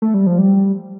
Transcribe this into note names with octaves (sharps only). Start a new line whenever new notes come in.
A3
G3
F3
G3